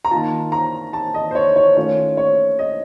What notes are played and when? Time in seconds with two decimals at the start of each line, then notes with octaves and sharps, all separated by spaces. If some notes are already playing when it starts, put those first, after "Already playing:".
0.05 A#5
0.11 D#3 A#3 F4 A5
0.52 A#5
0.93 A5
1.14 D#5
1.31 C5
1.35 C#5
1.56 C#5
1.76 D#3 A3 C#4 F4 C#5
2.17 C#5
2.59 D#5